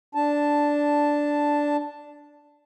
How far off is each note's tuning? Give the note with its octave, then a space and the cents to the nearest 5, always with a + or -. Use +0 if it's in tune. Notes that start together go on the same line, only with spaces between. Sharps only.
D4 -5 A5 +0